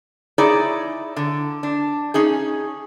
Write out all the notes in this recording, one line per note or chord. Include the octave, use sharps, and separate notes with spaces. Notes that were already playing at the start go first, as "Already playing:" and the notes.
D#4 E4 G#4 C#5 D5
D3
D4
C#4 D#4 G#4